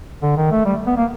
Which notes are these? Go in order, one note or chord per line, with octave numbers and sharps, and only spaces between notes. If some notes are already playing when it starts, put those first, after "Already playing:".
D3
D#3
A3
G3
B3
A#3